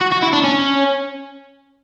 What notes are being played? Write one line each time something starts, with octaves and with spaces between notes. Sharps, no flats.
F#4
F#4
E4
D4
C#4